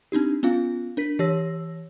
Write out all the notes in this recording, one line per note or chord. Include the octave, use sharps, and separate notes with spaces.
C4 D4 D#4 G4
B3 C#4 F4 F5
D4 A#4 B6
E3 G4 C#5 E6 A#6